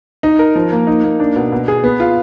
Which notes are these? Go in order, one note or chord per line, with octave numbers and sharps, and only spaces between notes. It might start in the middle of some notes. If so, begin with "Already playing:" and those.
D#4
A#4
F3
A#3
D#4
A#3
D4
B2
B2
G#4
B3
F4